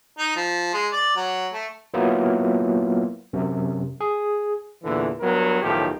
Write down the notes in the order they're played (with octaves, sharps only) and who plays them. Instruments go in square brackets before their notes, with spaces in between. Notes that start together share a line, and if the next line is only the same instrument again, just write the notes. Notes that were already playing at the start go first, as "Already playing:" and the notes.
[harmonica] D#4
F3
G#3
D5
F#3
A3
[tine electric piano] F#3 A#3 B3 E4 F4
F#2 C3
G#4
[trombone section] E2 A#2 D3 E3
G2 F#3 B3 A#4
B1 A2 D#3 F3 G4